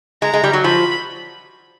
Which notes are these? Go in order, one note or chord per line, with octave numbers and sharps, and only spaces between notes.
G#3 A#5
G#3
G3
F#3
F3 B5